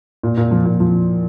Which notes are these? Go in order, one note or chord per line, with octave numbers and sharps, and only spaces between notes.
A#2
A#2
F3
A#2
F3